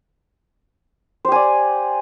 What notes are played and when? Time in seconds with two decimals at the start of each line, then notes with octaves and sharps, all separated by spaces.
1.25 C5
1.28 G4
1.32 G#5
1.35 D5